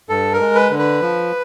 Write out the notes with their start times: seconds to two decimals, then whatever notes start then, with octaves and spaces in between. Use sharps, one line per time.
0.09 G2 A4
0.33 A#4
0.40 G#3
0.55 B4
0.71 D3
0.79 B4
1.01 F3